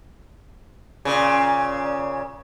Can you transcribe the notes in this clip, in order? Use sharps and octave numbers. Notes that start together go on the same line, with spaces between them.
A#2 C#3